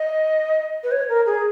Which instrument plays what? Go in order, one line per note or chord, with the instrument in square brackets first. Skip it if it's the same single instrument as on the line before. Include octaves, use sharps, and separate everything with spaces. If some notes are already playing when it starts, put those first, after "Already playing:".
Already playing: [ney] D#5
B4
C#5
A#4
G#4